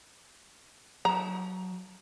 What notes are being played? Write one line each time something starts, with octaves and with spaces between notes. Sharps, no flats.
F#3 A5 A#5